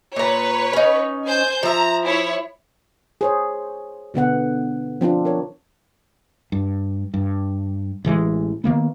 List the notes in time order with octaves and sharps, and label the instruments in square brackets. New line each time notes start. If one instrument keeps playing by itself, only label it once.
[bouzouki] A#2 A#5 [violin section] B4 C#5
[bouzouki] C#4 D#4
[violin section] C5 G#5 G6
[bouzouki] F3 E5 [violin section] A#5
[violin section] E4 C#5
[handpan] G#4 C5 C#5
B2 D3 B3 F#5
F3 C4 D4 F4
A#4 C#5
[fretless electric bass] G2
G2
A1 E3 F3 G#3
D#3 F3 A#3 B3